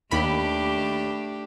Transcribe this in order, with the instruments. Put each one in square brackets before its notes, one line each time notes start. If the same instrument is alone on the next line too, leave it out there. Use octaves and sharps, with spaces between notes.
[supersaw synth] D#2 B5 [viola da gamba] A3 D4 G4